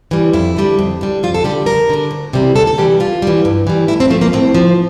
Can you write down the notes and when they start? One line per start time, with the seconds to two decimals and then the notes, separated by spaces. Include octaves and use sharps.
0.11 E3 G3
0.33 F2 E4
0.57 D3 G3
0.79 F2
1.01 D3 G3
1.23 F2 F4
1.34 A4
1.44 D3 G3 G4
1.66 F2 A#4
1.89 D3 G3
2.11 D2
2.33 C3 E3 G3
2.56 D2 A4
2.67 A4
2.78 C3 E3 G3 G4
3.00 G2 F4
3.22 E3 G3
3.45 G2
3.67 E3 G3
3.88 A2 E4
4.00 C4
4.10 F3 A3
4.21 A#3
4.33 A2 C4
4.55 F3